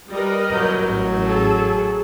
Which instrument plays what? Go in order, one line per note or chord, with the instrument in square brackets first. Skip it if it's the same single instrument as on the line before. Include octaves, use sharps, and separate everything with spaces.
[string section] G3 [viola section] A#4 B4 D#5
[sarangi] F#3 [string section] G6
[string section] A1
[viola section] G#4 A4